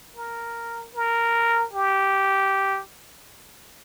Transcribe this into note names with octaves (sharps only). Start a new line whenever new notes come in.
A#4
A#4
G4